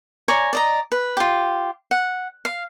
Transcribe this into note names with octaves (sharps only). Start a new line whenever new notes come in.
C#5 D5 G#5 A#5
D5 D#5 A#5
B4
F4 G4
F#5
F5